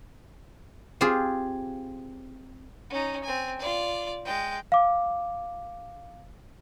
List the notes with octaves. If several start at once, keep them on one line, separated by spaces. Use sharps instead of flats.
C4 F4 G4 G#4
C#4 D#4
C4 G#5
F4 D5
G#3 G5
F5 D6